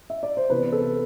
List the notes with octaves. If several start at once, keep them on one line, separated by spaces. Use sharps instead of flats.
E5
D5
C5
C3 E3 B3 B4
A4